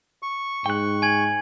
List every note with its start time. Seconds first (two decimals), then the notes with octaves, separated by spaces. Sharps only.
0.23 C#6
0.66 G#2 G5 F#6
1.02 G#5 G#6 F#7